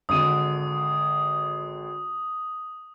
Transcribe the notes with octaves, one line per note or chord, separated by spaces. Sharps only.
G#1 D3 D#6 D#7